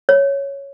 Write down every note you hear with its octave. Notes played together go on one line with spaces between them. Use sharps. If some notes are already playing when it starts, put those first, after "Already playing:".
C#5